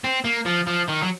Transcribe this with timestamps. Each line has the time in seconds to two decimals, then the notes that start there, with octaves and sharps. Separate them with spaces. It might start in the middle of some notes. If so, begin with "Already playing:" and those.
0.04 C4
0.25 A#3
0.46 F3
0.67 F3
0.88 D#3
1.02 F#3